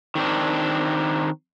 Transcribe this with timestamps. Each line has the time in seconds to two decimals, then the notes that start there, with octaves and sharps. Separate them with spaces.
0.15 D#3 C4 D4